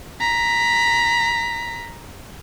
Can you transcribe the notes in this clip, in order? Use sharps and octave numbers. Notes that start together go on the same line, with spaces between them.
A#5 B6